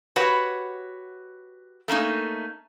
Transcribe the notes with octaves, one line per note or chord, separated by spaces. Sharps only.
F#4 G4 B4 C#5 F#5
A3 A#3 C#4 D#4